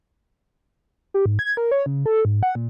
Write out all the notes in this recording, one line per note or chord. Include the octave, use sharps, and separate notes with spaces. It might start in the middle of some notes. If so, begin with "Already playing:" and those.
G4
G#2
G#6
A#4
C#5
C#3
A4
G#2
F#5
A#2